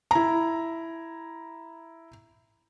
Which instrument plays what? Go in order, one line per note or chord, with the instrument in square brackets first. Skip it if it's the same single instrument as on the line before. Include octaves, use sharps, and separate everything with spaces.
[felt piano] E4 A#5